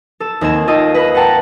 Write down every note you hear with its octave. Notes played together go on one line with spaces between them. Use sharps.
A4 E7
D#2 C4 G#6 E7
F4 A4 D#5 G5 D#6
B4 D#5 B5
F#5 G5 A5 A#5